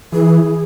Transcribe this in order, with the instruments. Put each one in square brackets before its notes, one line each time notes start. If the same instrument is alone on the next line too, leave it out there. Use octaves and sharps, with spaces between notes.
[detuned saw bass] E3 [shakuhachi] G#4